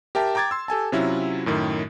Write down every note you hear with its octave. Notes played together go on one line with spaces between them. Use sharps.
G4 A#4 E5 G5 A5
G5 A#5 D6 G#6 A6
C6 E6
G4 A4 G#5 A5
C3 F#3 C#4 E4 F4
F#2 A2 D#3